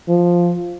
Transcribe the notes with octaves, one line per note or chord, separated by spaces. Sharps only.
F3